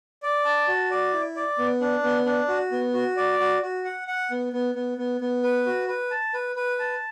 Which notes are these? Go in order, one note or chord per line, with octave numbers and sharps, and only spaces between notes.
D5
A5
F#4
D5
E4
D5
B3
D4
B3
D4
F#4
B3
F#4
D5
F#4
F#4
F#5
F#5
B3
B3
B3
B3
B3
B4
F#4
B4
A5
B4
B4
A5